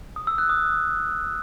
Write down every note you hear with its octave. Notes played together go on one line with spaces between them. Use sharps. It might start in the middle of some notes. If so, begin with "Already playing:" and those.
D#6
E6
F#6
D#6